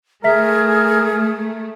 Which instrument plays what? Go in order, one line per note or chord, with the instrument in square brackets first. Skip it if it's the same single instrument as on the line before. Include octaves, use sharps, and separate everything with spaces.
[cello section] A3 [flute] G#4 [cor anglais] A#4 [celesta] E5 B6